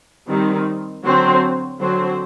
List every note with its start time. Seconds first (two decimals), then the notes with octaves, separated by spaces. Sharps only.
0.28 D#3 G3 C4 D#4
1.03 D3 F#3 C4 F#4 C5
1.79 D3 F#3 C4 F#4 C5